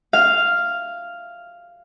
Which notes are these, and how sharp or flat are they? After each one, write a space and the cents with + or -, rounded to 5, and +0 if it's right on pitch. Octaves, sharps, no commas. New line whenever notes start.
F5 -5